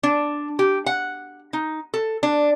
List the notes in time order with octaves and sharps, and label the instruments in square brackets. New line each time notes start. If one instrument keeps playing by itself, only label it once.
[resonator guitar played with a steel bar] D4
G4
F#5
D#4
A4
D4